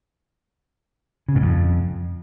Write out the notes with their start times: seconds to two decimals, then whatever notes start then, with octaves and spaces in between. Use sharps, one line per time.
1.28 C#3
1.35 G#2
1.42 F2